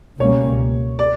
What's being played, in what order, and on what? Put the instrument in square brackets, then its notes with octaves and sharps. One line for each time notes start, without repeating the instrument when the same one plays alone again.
[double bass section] C#2 B2 G3 A#3 C#4 [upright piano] C#5
[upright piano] D5